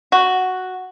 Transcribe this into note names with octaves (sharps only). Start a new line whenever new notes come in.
F#4